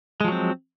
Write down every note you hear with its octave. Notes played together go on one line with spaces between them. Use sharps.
F3 F#3 G#3 C4